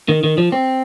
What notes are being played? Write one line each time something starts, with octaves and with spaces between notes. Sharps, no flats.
D#3
D#3
F3
C4